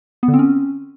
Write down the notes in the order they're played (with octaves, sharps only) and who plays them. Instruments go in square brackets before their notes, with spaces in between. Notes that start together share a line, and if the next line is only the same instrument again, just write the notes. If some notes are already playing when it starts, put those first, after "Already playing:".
[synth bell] B3
D3
C4
C#4